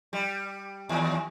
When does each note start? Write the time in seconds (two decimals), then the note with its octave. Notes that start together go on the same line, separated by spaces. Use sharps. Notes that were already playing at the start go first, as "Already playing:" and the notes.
0.13 G3
0.89 D#2